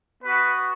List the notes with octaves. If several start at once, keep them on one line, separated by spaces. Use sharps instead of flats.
B3 F#4 B4